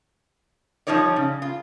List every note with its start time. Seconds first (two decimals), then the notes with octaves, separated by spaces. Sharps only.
0.87 F3 G3 D#4 C#5 D5
1.16 C#3
1.42 F4